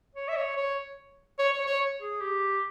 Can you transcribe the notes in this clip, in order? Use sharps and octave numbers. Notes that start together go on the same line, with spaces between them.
C#5
E5
C#5
C#5
C#5
C#5
C#5
G#4
G4